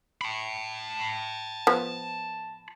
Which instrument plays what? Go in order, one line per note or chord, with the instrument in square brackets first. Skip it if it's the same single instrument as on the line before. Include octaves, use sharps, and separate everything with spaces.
[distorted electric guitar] A5 B5
[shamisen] F3 B3